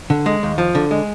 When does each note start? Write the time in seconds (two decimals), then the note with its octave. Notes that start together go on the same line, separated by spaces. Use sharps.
0.10 D3
0.26 G#3
0.43 D#2
0.58 F3
0.75 D3
0.91 G#3